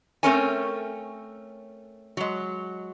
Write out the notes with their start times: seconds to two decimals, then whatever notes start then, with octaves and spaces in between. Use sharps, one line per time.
0.23 A3 C4 C#4 A#4 C#5 G#5
2.17 F#3 G#3